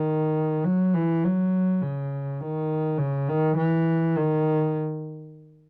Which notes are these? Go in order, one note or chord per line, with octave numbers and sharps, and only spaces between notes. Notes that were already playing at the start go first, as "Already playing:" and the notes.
Already playing: D#3
F#3
E3
F#3
C#3
D#3
C#3
D#3
E3
D#3